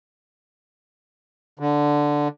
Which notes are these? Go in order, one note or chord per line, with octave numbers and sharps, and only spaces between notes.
D3